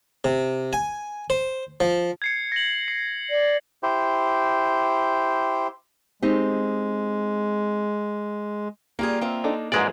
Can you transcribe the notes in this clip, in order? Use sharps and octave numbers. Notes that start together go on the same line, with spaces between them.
C3
G#5
C5
F3
G#6 C7 C#7
A#6 F#7
C7
D5
E4 G4 C5
G#3 C4 D#4 G4
G3 A#3 F4 G#4
C4 F4 E5
D4 D#4 A4
F2 G#2 E3 F#3 G#3 A#3 G#4 D5